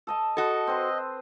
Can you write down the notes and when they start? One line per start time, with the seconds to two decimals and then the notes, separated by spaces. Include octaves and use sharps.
0.07 A4 D#5 A5
0.37 F#4 A4 D#5 B5
0.67 C4 B4 C6